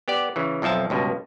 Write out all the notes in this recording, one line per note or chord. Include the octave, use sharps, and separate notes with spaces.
B3 G4 D5
C#3 E3
B1 F2 F3 E5 A5
C#2 G2 B2